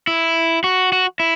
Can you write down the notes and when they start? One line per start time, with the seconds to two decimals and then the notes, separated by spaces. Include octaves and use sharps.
0.07 E4
0.64 F#4
0.92 F#4
1.20 E4